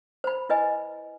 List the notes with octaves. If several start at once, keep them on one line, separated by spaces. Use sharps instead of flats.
C5 B5
E4 B4 D#5 G#5